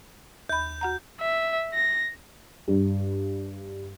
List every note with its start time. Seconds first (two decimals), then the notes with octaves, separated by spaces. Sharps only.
0.49 D#2 B5 G6
0.81 F#4 F#5 A#5
1.21 E5
1.74 A#6
2.68 G2